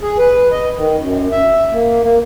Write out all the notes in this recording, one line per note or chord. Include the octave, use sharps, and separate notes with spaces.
G#4
B4
D#5
D#3
F#2
E5
A#3
A#3